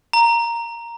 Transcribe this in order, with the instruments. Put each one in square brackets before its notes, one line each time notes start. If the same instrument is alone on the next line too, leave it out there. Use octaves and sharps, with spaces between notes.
[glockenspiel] A#5